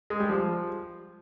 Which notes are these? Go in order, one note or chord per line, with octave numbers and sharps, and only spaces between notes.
G#3
G3
F3